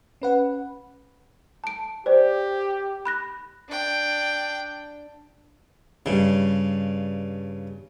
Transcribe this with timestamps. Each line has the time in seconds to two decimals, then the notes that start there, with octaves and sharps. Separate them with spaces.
0.22 C#4 B4 F#5
1.64 A5 D7
2.06 G4 C5 D5
3.05 B5 F#6 A#6
3.69 D4 G5
6.06 G2 C#3